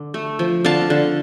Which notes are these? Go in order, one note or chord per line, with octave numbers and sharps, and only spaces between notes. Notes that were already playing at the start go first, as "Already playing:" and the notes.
Already playing: D3
A3
F3
D3 F5 A5
D3